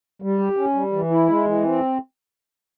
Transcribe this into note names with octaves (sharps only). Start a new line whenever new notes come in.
G3
G4
C#4
G3
E3
E4
G#3
E3
C4